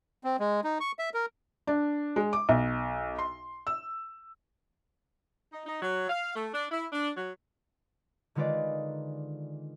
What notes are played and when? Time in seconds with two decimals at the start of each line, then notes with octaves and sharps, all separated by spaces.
0.24 C4
0.40 G#3
0.64 D#4
0.80 C#6
0.99 E5
1.14 A#4
1.67 D4
2.16 G#3
2.33 D6
2.49 B1
3.19 C6
3.67 E6
5.53 D#4
5.67 D#4
5.82 F#3
6.10 F5
6.35 A3
6.54 D4
6.72 E4
6.92 D4
7.16 F#3
8.35 D3 D#3 G#3 F4 B4 D5